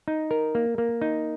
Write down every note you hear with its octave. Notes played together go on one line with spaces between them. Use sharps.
D#4
A#4
A#3
A#3
D#4